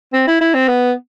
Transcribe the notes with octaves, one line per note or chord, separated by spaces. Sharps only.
C4
E4
E4
C4
B3